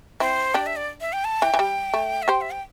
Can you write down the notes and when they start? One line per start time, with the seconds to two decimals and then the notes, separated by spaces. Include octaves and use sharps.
0.20 C4 E4 C5
0.54 D4 G4 D5
0.66 E5
0.76 D5
1.01 E5
1.13 G5
1.24 A5
1.42 E3 G5
1.54 E3
1.59 G3
1.94 A3
2.22 E5
2.28 G4 C5 G5
2.41 E5
2.51 G5